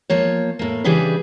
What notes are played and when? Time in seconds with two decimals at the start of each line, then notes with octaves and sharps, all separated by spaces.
0.10 F3 A#3 C#5
0.59 A2 A#3
0.84 C#3 E3 G3 D4 G#4 B4